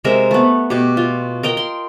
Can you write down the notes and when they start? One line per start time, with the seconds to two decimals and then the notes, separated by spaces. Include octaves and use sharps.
0.04 C3 G#3 A#4 E5
0.31 A3 B3
0.70 B2 G4
0.97 F4
1.43 A#4 D#5 G5
1.57 C6